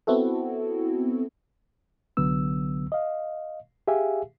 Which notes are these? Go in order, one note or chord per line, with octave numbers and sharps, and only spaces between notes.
B3 C4 E4 F#4 A4
C2 D3 F#3 B3 E6
D#5 F5
G4 G#4 E5 F5 G#5